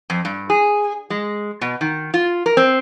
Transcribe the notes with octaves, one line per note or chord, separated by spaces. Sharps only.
F2
G2
G#4
G#3
B2
D#3
F4
A#4
C4